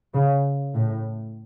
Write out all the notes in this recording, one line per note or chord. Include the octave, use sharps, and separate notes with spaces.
C#3
A2